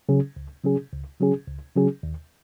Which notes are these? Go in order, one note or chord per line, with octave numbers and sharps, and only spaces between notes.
C#3 F#3 C#4 G#4
C#2
C#3 F#3 C#4 G#4
C#2
C#3 F#3 C#4 G#4
C#2
C#3 F#3 C#4 G#4
D#2